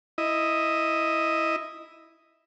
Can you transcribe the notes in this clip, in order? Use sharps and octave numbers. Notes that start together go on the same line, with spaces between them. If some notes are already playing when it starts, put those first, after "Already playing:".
E4 D#5